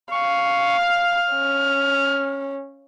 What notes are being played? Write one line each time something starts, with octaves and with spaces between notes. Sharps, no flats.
F5 C#6
F6
C#4